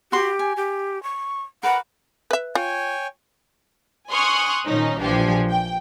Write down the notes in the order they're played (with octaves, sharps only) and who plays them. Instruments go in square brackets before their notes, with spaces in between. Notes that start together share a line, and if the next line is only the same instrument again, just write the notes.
[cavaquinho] F#4 F#5 C6 [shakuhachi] G4
[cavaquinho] G#5
[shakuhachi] G4
C#6
[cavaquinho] A#4 B4 D5 [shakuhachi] F#5
[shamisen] B4 E5
[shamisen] F4 [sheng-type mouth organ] C#5 G5 G#5
[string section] G#5 C6 C#6 D#6 F6 F#6
A#2 D#3 F3 C#4 D#4
A#1 E3 F3 D4 G4 G#5
G5